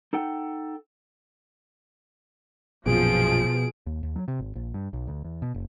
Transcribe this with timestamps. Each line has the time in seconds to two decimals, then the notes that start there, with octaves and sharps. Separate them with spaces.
0.13 D#4 A4 F#5 G5
2.86 A#1 F#2 B2 F3 G#4 D7
3.86 D#2
4.03 D#2
4.16 F#3
4.28 C3
4.39 G#1
4.56 A#1
4.74 G2
4.93 B1
5.07 D2
5.25 E2
5.42 B2
5.55 F#1